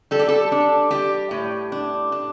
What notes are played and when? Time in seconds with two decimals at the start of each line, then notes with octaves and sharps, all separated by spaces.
0.11 G3 A4
0.19 G4
0.29 A4
0.52 D4
0.91 G3 G4
1.31 A2
1.72 D4
2.12 D4